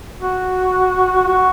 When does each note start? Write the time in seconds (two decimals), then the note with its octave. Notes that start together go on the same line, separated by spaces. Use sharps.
0.20 F#4
1.28 F#4